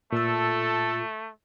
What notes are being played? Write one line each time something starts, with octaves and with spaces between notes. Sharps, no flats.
A#2 A3 F4 A4 E6